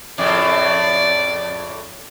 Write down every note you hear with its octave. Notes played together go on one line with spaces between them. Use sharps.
F2 A2 C#3 D5